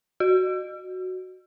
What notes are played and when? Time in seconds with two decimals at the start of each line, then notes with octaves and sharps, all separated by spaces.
0.20 F#4